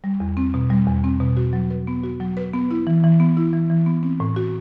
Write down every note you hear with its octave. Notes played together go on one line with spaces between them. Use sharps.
G3
E2
C4
B2
G3
E2
C4
B2
F#4
F#3
B4
B3
F#4
F#3
B4
B3
E4
E3
E3
B3
E4
E3
E3
B3
C4
A2
F#4